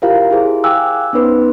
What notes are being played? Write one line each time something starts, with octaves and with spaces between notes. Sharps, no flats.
E4 F4 G4 A#4 C5 F5
E4 G#4 C5
F5 G5 G#5 D6 E6 F#6
B3 C#4 D#4 B4 C5